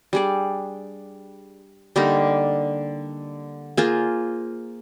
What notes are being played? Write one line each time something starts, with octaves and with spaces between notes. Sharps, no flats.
G3 D4 G#4 D5
D3 G3 A#3 D#4
A#3 F4 G#4 C5